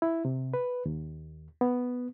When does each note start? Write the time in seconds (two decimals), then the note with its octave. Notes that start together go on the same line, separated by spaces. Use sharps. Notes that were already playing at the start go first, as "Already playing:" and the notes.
0.02 E4
0.25 C3
0.54 B4
0.85 D#2
1.61 B3